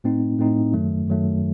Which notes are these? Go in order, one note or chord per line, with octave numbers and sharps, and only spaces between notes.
A2 A3 C4 D#4
A2 A3 C4 D#4
F#2 D#3 F#3 A3
F#2 D#3 F#3 A3